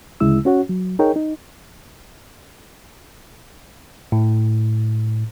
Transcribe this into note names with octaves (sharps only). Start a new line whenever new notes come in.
D2 C#3 G#3 E4 E6
C#4 F#4 C#5 F#5
F#3
D#4 G#4 A#4 C#5 G5
D#4
A2